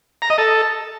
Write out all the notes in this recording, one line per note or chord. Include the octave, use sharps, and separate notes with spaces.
A#5
D#5
A4